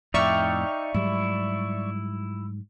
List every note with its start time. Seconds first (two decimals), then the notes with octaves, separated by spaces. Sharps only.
0.14 F2 A2 D#4 D5 E5 F5 G5 C#6
0.94 G#2 F#3 G3 E4